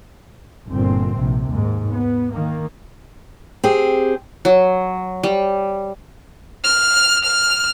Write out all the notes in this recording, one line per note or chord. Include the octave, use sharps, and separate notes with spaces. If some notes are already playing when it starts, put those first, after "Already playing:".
G1 G2 A#2 C4
A#1 C3
D#2 G#2
B3
D#3 A#3
C4 G4 G#4
F#3
G3
F6
F6